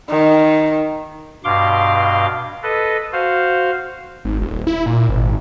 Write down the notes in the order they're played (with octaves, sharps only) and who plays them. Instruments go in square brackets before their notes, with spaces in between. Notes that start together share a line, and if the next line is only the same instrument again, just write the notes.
[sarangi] D#3
[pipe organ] G2 B2 F5 C6 D6
A4 B4 D#5
F#4 C5 F5
[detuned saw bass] G#1
D#1
E4
A#2
G#1